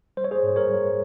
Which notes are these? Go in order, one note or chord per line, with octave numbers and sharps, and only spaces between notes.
G3 C5
C#5
G#4 C5
G#2
A#4 C#5
G3